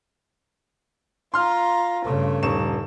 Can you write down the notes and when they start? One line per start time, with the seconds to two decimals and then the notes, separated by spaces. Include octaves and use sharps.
1.34 F4 A#5 C6 F6
2.05 G2 C#3 A3
2.43 D#1 C#6 E7